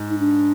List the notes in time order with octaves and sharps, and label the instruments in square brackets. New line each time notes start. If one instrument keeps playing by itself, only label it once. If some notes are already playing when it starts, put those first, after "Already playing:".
Already playing: [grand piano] G#2
[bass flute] D#4
D4